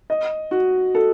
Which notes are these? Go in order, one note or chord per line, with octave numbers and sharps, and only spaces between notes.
D#5
F#4
A4